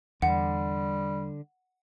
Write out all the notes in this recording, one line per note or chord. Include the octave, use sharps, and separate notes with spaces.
E2 D3 G3 F#5